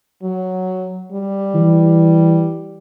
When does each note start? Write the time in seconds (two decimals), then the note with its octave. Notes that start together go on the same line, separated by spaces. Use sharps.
0.22 F#3
1.12 G3
1.55 E3